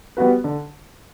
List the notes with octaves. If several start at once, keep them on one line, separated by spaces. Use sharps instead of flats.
G3 B3 F#4 B4
D3